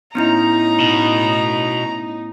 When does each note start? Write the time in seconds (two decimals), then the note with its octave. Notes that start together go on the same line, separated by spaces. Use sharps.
0.15 A2 B3 C#4 D#4 E4 A#5
0.80 B2